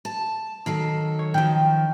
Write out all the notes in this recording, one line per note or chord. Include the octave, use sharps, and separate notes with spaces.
A5
D#3 F#3 A4 C7
C#5
D#3 F3 G5